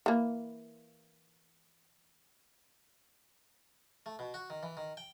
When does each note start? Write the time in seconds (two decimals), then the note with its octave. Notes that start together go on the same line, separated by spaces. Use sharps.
0.06 E3 A#3
4.06 A3
4.19 B2
4.34 F#4
4.50 D#3
4.63 E3
4.77 D#3
4.97 G5